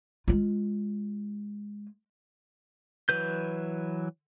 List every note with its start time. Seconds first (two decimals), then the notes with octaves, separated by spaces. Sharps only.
0.28 G#3 F4
3.09 E3 F#3 B4 G6